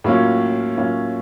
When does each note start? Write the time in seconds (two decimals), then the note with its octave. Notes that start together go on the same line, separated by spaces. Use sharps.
0.04 A2 F#3 A#3 C#4 F4
0.77 A2 F#3 A#3 C#4 F4